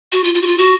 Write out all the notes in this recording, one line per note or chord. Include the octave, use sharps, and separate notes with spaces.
F#4
F4
F4
F#4
F4
F#4